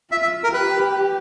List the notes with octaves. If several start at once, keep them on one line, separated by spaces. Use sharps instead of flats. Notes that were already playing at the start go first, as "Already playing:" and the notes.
F4 E5
E5
A#4
G4 B4